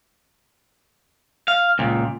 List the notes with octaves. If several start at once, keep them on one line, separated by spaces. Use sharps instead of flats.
F5
C#2 A#2